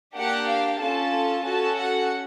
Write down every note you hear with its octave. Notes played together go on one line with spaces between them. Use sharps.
A#3 D4 G4 F#5
F5
C#4 F4 A4 A5
C#4 F#4 A4 A5
F#5